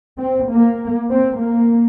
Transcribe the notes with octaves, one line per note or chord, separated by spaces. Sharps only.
C4
A#3
C4
A#3